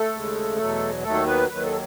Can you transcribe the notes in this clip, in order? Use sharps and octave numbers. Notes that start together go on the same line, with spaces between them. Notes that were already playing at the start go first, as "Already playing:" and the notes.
Already playing: A3 A4
D#2 C#3 G#3
E2 B2 F#3
D#2 D#3 F#3 A3 A4
B3 B4
D#2 D#3 F#3 B4
A4